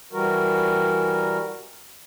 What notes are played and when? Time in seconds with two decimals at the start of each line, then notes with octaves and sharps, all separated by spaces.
0.13 E3 G3 F#4 A#4